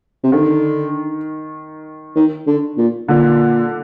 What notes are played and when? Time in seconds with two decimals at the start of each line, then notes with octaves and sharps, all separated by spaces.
0.24 C3
0.32 D3 D#3
2.16 D#3
2.47 D3
2.77 A#2
3.08 A#2 D3